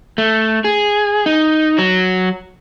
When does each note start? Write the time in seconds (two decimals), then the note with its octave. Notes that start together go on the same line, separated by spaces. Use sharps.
0.18 A3
0.64 G#4
1.26 D#4
1.78 F#3